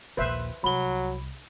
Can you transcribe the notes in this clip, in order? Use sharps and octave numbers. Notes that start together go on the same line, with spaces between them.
A#1 D#2 B4 C5 E5
C2 F#3 B5 G7